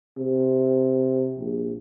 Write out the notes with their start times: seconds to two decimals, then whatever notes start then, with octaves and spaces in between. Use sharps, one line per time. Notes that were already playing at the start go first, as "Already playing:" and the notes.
0.18 C3
1.39 A#1